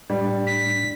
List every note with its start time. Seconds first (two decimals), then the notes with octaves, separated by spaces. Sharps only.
0.10 A2 G3 D4
0.47 B6